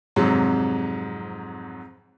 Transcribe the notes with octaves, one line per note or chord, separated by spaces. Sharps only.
F2 G#2 C3 F#3